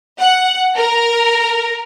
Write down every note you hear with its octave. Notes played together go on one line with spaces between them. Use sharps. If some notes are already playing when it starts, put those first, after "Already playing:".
F#5
A#4